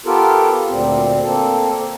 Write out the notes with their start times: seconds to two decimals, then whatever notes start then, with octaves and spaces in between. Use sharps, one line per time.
0.06 B3 F4 G4 A4 A#4
0.68 D2 A#2 C4
1.22 A#3 C4 A4